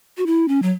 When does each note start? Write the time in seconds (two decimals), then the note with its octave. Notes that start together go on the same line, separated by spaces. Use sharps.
0.17 F#4
0.26 E4
0.48 C#4
0.62 F#3